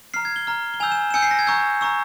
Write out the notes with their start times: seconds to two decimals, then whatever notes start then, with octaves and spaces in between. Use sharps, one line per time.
0.14 A#5 F6 C7
0.25 G#6
0.36 G7
0.47 A#5 F6
0.74 G7
0.80 G#5 E6 G6 F7
0.92 E7
1.10 E7
1.14 G#5 E6 G6 C#7
1.22 C7
1.31 A#6
1.39 G#6
1.47 A#5 C#6 E6 G6
1.81 A#5 C#6 E6